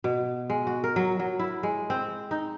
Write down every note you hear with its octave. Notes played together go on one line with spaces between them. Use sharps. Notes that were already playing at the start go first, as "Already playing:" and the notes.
B2
G#3
F#4
A#4
F#3
F#3
E4
G#3
C4
D#4